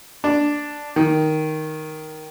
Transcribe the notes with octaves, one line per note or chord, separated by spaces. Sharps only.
D4
D#3